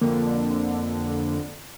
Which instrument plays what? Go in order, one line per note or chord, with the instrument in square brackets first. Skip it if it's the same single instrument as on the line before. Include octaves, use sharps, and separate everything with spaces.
[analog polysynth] F2 D3 [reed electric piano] A#3